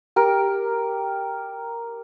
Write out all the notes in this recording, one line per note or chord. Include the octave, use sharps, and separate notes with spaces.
G4 A#4